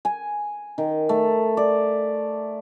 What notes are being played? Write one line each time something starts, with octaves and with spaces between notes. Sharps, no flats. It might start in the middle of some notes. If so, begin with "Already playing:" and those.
G#5
D#3
A3
D5